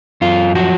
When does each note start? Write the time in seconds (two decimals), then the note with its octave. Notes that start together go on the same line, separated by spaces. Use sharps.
0.21 F#2 F4
0.55 F3 F#4